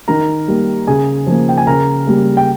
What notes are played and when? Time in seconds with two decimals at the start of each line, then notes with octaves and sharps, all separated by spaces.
0.08 D#3 A#4 A#5
0.48 G3 A#3
0.87 C#3 G#4 G#5
1.27 F3 A#3
1.49 G5
1.57 G#5
1.67 C#3 A#4 A#5
2.07 G3 A#3
2.37 G5